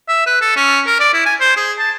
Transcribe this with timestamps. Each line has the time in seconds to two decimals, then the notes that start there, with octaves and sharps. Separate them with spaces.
0.09 E5
0.26 B4
0.41 A4
0.56 C#4
0.87 A#4
1.00 D5
1.14 E4
1.26 G#5
1.41 C5
1.57 G#4
1.79 A5